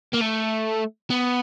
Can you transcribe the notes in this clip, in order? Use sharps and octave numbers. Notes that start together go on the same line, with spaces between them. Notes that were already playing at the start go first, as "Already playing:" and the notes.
A#3
A3
B3